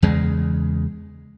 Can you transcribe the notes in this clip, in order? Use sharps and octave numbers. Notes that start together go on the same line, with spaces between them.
E2 C#3 G#3